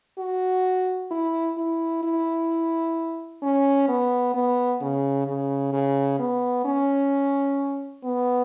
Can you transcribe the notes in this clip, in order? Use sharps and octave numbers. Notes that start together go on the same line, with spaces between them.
F#4
E4
E4
E4
C#4
B3
B3
C#3
C#3
C#3
B3
C#4
B3